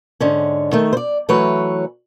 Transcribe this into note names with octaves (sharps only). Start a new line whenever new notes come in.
G#2 D3 C#4
D#3 A3
C5 D5
E3 F#3 A3 B4 C#5